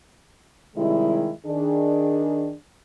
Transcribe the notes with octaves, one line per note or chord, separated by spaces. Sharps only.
C3 D#3 G3 G#3 E4
D#3 D4 G#4